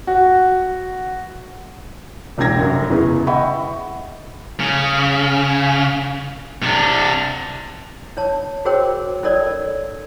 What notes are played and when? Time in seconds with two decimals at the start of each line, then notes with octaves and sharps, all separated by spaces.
0.07 F#4
2.38 E1 C2 A#3 G5 G#6 A#6
2.60 F1 F#2
2.90 E2 C#3 E3 B3
3.27 D#5 E5 F#5 G5 B5 C#6
4.60 C#3
6.63 C3 D4
8.17 D4 C#5 A5
8.65 F#4 G#4 A#4 C5 C#5 G5
9.23 C#4 D#4 A4 A#4 C#5 D5